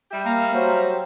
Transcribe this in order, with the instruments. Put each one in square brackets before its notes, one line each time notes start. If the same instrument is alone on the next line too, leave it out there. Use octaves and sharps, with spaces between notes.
[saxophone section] G3 G4 E5
[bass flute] A#3 [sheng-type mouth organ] F5 A#5
[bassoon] F#3 [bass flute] C5